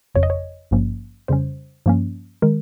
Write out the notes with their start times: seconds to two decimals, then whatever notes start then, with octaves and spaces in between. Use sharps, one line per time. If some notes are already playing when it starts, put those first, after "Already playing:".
0.15 G1 F2 C#3 C#5
0.23 D#5
0.30 C#5
0.71 G#1 G2 F3 A#3 C#4
1.28 F2 C#3 G3 C#4 C5
1.86 G2 F3 A#3 C#4
2.42 D#3 G#3 A#4